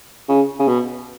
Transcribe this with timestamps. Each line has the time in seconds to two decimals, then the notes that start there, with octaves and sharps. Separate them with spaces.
0.29 C#3
0.59 C#3
0.68 B2